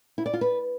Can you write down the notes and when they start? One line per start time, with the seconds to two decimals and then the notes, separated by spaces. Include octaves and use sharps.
0.18 E4
0.26 D5
0.33 F4
0.41 B4